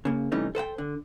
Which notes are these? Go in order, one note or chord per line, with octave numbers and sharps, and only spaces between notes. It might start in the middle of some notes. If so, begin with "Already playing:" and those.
C#3 A#3
C3 E3 G3 A3 C#4 D#4
A4 C5 F#5 G5
D3